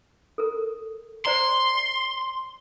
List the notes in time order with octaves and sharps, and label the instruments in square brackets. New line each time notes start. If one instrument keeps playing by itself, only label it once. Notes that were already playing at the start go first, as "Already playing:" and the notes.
[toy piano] A4 A#4
[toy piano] C5 D5 A#5 [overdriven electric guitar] C6